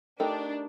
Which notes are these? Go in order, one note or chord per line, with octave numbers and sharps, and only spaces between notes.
A3 D4 D#4 G4 A#4